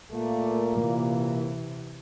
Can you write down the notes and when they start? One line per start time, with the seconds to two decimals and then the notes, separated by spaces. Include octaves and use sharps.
0.12 A#2 A3 A#3
0.79 C3 E3